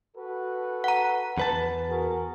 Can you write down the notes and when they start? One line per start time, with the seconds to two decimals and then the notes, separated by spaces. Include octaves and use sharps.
0.17 F#4 A4 B4
0.84 F#5 A#5
1.38 E2 B4 A5
1.90 F#4 G#4 A#4